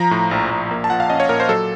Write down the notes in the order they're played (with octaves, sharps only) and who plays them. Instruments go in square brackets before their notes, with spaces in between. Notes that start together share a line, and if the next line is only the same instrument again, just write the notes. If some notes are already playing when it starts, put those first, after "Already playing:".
Already playing: [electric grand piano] F3 A#5
A2
A#1
A#1
A#3
A5
F3 F#5
F5
C#4 D#5
C#5
A#2 A#4
C5
F#3 A4